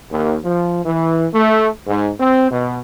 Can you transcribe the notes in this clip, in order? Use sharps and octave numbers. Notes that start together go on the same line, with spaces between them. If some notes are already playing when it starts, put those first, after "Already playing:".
D#2
F3
E3
A3
G#2
C4
B2